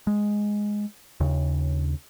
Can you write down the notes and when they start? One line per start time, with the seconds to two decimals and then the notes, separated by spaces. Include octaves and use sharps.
0.07 G#3
1.20 D#2 C#3